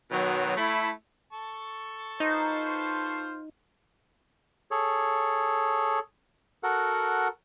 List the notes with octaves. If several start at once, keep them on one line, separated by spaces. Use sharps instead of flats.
B2 D#3 F#3
A3 E4
A4 A5 C#6
D#4 F4 B4 C5
G#4 A4 C#5
F#4 A4 A#4 F#5